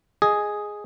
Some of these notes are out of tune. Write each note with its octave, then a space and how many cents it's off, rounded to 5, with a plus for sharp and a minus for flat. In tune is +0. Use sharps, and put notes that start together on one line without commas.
G#4 +0 D#5 +0